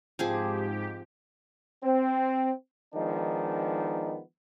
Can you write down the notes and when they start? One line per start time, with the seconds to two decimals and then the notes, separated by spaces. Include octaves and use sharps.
0.19 G#2 F3 C4 G4 G#4
1.83 C4
2.95 D#3 F3 G#3 B3 D4 D#4